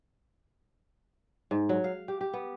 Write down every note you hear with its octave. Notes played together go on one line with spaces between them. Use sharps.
G#2
F#3
F5
G4
G4
B3